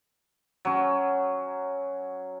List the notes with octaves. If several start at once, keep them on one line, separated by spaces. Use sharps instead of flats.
F#3 C#4